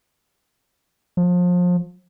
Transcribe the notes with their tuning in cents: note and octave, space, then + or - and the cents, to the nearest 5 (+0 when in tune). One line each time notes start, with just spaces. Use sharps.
F3 +30